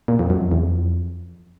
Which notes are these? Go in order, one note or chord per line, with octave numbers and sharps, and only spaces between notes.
A#2
F2
F#2
F2
E2
F2